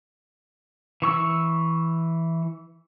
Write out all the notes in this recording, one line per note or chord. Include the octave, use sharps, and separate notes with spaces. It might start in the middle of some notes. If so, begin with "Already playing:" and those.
E3 C#6 E6